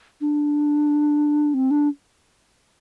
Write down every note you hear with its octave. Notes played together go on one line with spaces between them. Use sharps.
D4
C4
D4